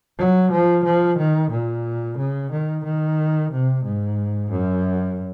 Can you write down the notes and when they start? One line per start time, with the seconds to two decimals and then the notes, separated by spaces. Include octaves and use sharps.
0.18 F#3
0.51 F3
0.84 F3
1.18 D#3
1.51 A#2
2.17 C#3
2.52 D#3
2.84 D#3
3.52 C3
3.84 G#2
4.51 F#2